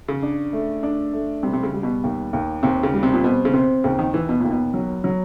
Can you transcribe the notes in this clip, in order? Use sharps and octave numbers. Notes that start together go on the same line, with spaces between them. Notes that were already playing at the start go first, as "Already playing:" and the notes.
C#3
D4
A3
D4
A3
C3 G3
C3
C#3
G3
B2
D#2
D#2
D#2 C3
C#3
G3
C3
A#2
B2 C4
C#3
C3 C4
D#2 C#3
D#3
D#2 E3
B2
D#2 A#2
B2
F#3
F#3